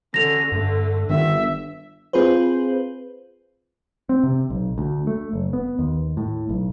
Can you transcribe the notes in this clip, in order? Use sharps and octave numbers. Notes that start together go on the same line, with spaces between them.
D3 C#4 A#6 F7
G2 D3 A3
G1 D#3 E5
C4 F4 G#4 B4 C5
C4
C3
B1
D2
A3
F#1
B3
D#2
A2
B1